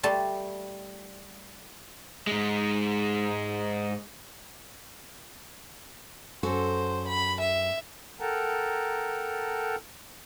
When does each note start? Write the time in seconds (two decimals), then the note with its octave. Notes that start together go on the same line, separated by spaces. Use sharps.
0.03 G3 A3 A5 C6
2.27 G#2 G#3
6.43 F#2 F#4 A4 C5
7.07 B5
7.40 E5
8.20 A4 A#4 F#5 G5 A5 A#5